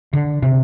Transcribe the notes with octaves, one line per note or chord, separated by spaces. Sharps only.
D3
C3